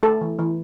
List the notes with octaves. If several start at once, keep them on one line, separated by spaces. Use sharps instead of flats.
A3 A4
E3
E3